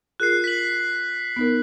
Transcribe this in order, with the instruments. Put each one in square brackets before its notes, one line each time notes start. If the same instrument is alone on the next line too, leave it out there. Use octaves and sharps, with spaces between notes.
[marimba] F4 G#4 A#4 [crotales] F#6 C7
[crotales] B6 F#7
[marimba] B3 D#4 A#4